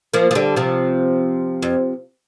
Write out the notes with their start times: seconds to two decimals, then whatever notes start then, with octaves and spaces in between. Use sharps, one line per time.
0.14 F3 A#3
0.31 F3
0.35 D3 G3
0.56 C3 F3
1.62 F2